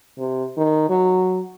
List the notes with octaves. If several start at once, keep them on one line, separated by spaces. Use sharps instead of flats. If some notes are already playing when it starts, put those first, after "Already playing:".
C3
D#3
F#3